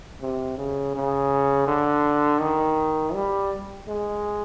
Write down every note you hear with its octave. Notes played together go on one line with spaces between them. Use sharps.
C3
C#3
C#3
D3
D#3
G3
G#3